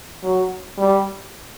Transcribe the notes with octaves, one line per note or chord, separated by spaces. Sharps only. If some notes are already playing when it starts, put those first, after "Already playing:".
F#3
G3